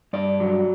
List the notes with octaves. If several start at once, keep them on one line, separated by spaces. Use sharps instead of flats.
G2 D5
F#3